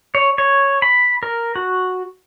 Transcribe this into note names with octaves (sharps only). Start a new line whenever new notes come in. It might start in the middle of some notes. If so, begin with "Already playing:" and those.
C#5
C#5
B5
A#4
F#4